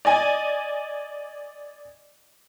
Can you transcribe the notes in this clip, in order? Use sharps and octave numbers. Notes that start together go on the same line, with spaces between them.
D5 D#5 G#5